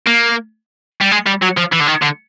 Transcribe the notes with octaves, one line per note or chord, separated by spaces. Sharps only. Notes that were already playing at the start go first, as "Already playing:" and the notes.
A#3
G3
G#3
G3
F#3
F3
E3
D3
D#3
D3